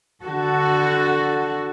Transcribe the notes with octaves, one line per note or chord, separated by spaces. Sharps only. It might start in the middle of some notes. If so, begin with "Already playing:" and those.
D3 F#4 A4